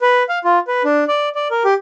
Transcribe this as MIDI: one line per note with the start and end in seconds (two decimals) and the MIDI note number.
0.01 0.23 71
0.29 0.39 77
0.44 0.59 65
0.68 0.83 71
0.85 1.04 62
1.08 1.29 74
1.35 1.48 74
1.51 1.63 70
1.65 1.74 67